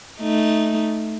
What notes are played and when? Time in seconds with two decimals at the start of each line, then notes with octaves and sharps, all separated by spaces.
0.19 A3 D#4